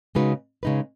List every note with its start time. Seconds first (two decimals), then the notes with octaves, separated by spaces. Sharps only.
0.15 C#3 G#3 D#4 F#4 B4
0.63 C#3 G#3 D#4 B4